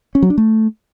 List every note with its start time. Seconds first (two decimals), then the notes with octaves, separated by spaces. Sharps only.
0.15 C#4
0.22 F#3
0.30 D4
0.38 A3